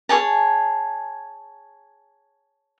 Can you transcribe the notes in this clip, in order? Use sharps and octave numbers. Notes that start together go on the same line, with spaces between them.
G#4 C#5 G#5 A5